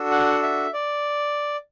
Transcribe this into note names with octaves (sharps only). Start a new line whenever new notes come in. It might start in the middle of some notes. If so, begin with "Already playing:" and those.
Already playing: D4 F#4 A4
F#5
E5
D5